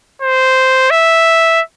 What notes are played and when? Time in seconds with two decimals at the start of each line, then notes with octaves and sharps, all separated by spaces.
0.22 C5
0.91 E5